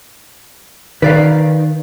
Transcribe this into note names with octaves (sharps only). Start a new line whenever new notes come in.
D#3 B4 D5 F5